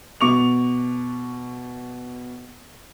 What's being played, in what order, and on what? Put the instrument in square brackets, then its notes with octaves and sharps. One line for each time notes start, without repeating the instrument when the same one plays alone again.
[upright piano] B2 C#6 D6 F7